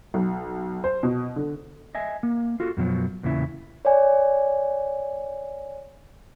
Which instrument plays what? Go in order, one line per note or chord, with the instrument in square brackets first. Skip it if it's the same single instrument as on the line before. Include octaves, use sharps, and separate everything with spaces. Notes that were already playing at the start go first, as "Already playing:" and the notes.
[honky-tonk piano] B1
C5
B2
D3
[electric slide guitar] D#5 E5 G#5
A#3
F4 F#4 A4
F#2 B2 F3 F#3
E2 A#2 C#3 E4
[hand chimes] C#5 D5 G#5